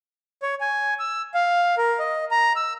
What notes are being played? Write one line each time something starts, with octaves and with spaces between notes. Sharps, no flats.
C#5
G#5
E6
F5
A#4
D#5
A#5
E6